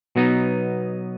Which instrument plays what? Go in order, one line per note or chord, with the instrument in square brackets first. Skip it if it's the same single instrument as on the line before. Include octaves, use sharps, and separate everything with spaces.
[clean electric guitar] B2 F#3 B3 D#4